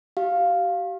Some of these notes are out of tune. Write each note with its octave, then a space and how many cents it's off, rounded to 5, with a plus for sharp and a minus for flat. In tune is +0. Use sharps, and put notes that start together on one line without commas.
G4 -40 F5 +0